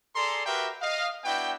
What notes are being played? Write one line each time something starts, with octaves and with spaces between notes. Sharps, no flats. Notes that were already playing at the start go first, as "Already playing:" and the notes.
G#4 A4 D5 A#5 C6
F#4 G4 A#4 B4 E5 G5
D#5 F5
B3 D4 E4 F#4 G5